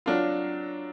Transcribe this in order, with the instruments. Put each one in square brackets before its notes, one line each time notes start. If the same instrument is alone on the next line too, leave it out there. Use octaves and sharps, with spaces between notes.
[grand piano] F#3 D4 F4